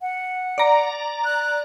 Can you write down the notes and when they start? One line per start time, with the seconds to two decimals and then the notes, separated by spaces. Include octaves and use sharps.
0.01 F#5
0.58 D5 A#5
1.25 F#6